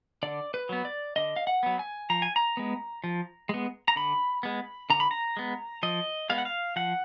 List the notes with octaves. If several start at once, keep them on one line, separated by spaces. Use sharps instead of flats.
D3 D5
B4
F#3 B3
D5
D3 D#5
F5
F#5
F#3 B3
G#5
F3 A#5
G#5
A#5
G#3 B3
F3
G#3 B3
A#5
D3 B5
G#3 B3
D3 A#5
B5
A#5
G#3 B3
F3 D#5
G#3 B3 F5
F#5
F5
F3 F#5